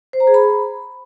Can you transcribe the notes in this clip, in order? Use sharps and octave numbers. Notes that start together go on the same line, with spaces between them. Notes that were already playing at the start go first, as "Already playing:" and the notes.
C5
A#5
G#4
B5